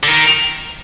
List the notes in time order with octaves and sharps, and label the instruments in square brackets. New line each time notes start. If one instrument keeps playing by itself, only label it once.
[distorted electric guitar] D3
D#3